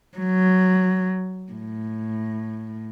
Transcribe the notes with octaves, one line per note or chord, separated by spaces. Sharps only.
F#3
A2